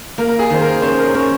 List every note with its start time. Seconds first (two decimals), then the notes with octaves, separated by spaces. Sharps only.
0.18 A#3 A#4
0.29 A#4
0.39 G#4
0.50 D#3 C5
0.61 A#4
0.82 C#4 C5
0.98 A#4
1.13 C#4 A#4